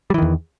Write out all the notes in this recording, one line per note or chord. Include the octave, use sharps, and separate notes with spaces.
E2 D#3 E3 G3